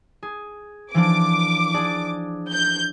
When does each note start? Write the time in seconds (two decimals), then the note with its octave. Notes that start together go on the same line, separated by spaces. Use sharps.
0.23 G#4
0.94 E3 F3 D4 D6
1.74 D4 G#4 D5
2.52 G6